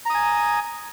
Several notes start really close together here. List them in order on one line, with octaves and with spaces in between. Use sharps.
A#5 D#6 G#5